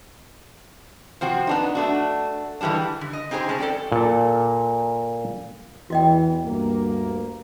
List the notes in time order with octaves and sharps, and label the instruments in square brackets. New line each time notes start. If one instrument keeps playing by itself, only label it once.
[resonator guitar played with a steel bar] C3 F3 C4 F#4
B3 D4 D#4
A3 D4 F#4
D3 E3 G3 G#3 D4
D3
D#5
C4 D#4 G4 G#4 B4 C5
C3 G#3 C#4 B4 A5
A4 D5 G5
[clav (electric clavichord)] A#2 A4
[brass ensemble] E2 E3 [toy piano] F#4 D#5 G5
[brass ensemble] D2 G2 A#3